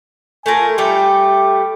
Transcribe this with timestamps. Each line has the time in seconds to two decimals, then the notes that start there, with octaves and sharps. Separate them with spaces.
0.46 A3 F4 A#4 G#5
0.78 G3 A3 G4 G5